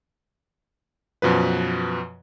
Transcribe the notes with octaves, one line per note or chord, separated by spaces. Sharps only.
F#2 B2 F3 B4